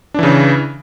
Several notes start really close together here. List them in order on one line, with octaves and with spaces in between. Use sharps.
D4 E3 C#3